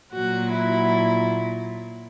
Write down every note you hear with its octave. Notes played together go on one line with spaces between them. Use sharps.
A#2 F#3 F#4
E4